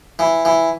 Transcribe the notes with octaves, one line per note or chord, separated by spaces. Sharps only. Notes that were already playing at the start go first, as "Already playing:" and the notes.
E3
E3